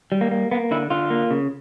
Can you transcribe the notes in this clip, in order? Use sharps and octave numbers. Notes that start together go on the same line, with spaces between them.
G3
A#3
A#3
A#3 B3
D3 E4
D3 F4
A#3
C#3